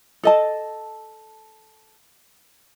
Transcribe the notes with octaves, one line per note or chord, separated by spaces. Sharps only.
A4 D#5 A5